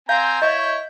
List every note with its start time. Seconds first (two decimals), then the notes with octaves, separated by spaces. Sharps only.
0.09 C4 F5 G#5 A#5 G6
0.42 E4 C#5 D#5